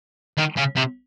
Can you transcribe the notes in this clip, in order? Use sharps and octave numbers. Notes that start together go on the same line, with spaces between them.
D#3
C#3
C3